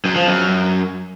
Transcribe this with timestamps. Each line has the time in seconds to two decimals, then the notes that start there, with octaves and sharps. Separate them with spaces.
0.05 F#2
0.16 F3
0.27 F#2